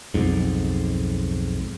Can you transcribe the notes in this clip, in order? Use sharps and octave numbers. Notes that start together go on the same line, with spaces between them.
B1 F2 G#2